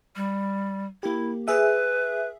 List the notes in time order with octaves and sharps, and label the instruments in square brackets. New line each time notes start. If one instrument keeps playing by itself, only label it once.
[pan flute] G3
[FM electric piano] A#3 G4 [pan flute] E4
[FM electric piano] G#4 E5 [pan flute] B4